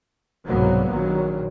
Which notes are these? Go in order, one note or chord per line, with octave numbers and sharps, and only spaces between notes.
C2 G#2 B2 F#3 A#3 B3
A#1 A#2 D#3 F#3